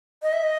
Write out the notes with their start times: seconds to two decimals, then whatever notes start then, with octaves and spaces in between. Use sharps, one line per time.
0.22 D#5
0.33 E5
0.44 D#5